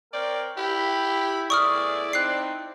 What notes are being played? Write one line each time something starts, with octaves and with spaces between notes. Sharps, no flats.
C4 A#4 C#5 D5 G5
E4 G4 B5
A2 B3 E4 G#4 D5 C#6 D#6 F6
C4 D#4 E4 F#6 C7